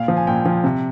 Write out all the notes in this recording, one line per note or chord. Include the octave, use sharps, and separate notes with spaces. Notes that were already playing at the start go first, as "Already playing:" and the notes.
Already playing: A#2 F5
F3
G#5
A#2 G5
F3
C3